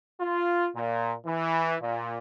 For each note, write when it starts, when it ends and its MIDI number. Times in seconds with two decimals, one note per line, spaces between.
0.20 0.68 65
0.75 1.14 46
1.26 1.75 52
1.81 2.18 46